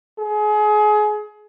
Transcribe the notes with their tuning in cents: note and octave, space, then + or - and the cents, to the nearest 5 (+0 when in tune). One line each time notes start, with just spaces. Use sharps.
G#4 +30